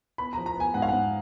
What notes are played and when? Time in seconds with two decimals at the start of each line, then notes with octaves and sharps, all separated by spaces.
0.18 B3 B5
0.33 A#5
0.37 F3
0.46 A#5
0.56 B3 G#5
0.74 G#2 F#5
0.82 F5
0.89 G#2 F#5